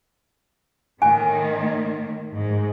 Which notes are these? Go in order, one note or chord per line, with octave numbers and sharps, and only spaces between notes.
A2 D#3 A#3 G#5
G#2